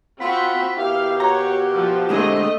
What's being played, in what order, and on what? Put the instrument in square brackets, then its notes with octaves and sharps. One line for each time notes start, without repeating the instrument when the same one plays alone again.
[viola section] C4 F#4 [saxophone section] F4 F#5 [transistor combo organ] B5
[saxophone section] B2 A#3 G4 [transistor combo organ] E4 [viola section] F5
[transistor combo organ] F#4 [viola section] C#5 [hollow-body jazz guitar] A#5
[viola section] F3
[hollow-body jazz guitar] D3 G#3 E4 [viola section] A3 C4 D#5